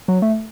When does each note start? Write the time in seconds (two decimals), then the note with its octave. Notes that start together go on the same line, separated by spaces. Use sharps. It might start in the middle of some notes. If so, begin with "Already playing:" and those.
0.08 F#3
0.22 A3